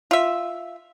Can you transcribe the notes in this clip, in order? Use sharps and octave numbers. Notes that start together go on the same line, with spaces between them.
F4 E5